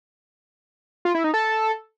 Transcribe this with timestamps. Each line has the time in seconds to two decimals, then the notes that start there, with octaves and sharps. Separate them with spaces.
1.05 F4
1.15 E4
1.24 D#4
1.34 A4